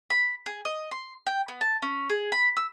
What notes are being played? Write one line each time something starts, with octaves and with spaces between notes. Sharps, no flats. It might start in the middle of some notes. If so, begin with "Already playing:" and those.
B5
G#4
D#5
C6
G5
B3
A5
C#4
G#4
B5
E6